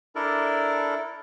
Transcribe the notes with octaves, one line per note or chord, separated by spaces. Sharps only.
D4 E4 A4 A#4 D5